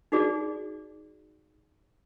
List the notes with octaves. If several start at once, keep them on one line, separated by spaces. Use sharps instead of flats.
D#4 F#4 G#4 D5